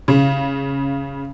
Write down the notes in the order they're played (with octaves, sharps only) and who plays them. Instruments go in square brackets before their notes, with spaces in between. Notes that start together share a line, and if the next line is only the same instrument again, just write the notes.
[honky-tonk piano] C#3